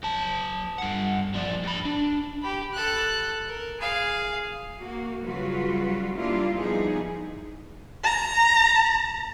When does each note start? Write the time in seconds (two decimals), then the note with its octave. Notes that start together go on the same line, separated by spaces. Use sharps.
0.03 F#3 A5
0.78 G2 F#5
1.34 F3 D4
1.63 G2 B5
1.85 D4
2.42 G4 B5
2.73 A4 F#6
3.48 A#4
3.80 G#4 F5
4.80 A#3 F#4
5.25 C#3 F#3 G3 F4 F#4 B4
6.15 G3 A#3 D4 E4 F4
6.55 F3 G3 B3 D#4 E4 G#4
8.04 A#5